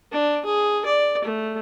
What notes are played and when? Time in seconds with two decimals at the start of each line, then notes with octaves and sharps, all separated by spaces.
0.12 D4
0.45 G#4
0.85 D5
1.24 A3